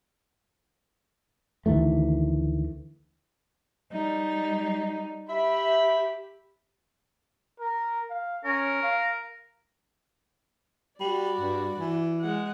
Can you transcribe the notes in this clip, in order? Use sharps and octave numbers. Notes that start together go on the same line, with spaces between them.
D2 D#3 E3 A3
G3 D#4
G4 E5 B5
A#4
F5
C#4 A#4
F5
G3 F#4 D5 B5
G2
E3
G#3 F#5